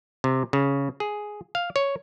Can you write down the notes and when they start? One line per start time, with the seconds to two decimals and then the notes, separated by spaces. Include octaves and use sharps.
0.24 C3
0.53 C#3
1.00 G#4
1.55 F5
1.76 C#5